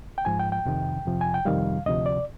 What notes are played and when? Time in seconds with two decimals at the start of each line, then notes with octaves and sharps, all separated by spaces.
0.18 G5
0.25 G#2 F3 G#5
0.39 G5
0.52 G5
0.65 F2 C3 D#3
1.05 F2 C3 F3
1.21 G#5
1.34 G5
1.45 F2 C3 D#3 G3 F5
1.86 D2 C3 F3 D#5
2.06 D5